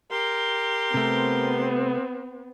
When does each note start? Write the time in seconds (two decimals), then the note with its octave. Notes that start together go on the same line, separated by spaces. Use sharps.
0.11 G4 A#4 C6
0.94 C3 A3 B3 C4